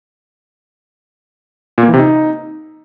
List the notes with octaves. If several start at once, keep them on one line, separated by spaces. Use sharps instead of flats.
A#2
A#3
E3
C3
D#4